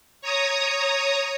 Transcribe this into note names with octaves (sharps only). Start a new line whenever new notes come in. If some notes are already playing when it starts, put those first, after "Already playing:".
C#5 A#5 D#6